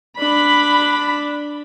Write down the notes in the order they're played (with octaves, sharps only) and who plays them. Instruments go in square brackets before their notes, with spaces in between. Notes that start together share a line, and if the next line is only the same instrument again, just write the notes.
[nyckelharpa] D4 [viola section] B5